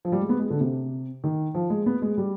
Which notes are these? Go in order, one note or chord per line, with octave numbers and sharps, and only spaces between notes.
F3
G3
G#3
B3
G#3
D3
C3
D#3
F3
G#3
B3
G#3
G3